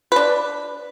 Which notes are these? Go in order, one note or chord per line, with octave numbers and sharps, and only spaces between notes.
D4 B4